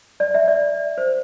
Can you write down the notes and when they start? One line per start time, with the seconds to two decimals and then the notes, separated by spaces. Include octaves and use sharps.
0.20 D5
0.34 E5
0.48 D5
0.98 C5